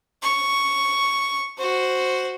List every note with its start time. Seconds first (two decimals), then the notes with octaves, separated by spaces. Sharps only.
0.22 C#6
1.58 F#4 C5